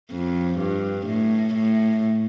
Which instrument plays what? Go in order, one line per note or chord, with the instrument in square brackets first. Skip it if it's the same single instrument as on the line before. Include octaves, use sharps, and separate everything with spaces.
[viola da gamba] F2
G2
A2
A2